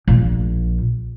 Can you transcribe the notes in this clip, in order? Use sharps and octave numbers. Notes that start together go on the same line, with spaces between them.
A#1